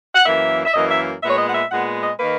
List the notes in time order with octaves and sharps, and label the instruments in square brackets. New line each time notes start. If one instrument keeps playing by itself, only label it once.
[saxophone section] F#5
F#2 E3 A#3 E5
E5
F#2 E3 A#3 D#5
E5
A#2 G#3 B3 E5
C#5
D#5
F#5
E5
A#2 G#3 B3 F#5
D#5
D#3 A#3 B4